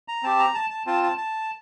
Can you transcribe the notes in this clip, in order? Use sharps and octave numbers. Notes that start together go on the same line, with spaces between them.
A#5
C4 G4 A5
A#5
A5
A5
C4 F4 A5
A5
A5